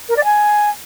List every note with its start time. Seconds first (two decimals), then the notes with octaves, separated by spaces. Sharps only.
0.09 A#4
0.16 D5
0.24 G#5